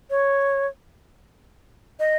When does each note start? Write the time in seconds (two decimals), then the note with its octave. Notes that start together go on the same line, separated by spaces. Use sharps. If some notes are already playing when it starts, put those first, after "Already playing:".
0.10 C#5
2.00 D#5